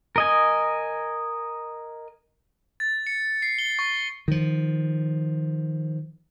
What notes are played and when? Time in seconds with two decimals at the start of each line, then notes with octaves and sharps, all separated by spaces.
0.16 A#4 D#5 G#5
2.80 A6
3.07 C#7
3.42 C7
3.58 G7
3.79 C#6
4.28 D#3 F3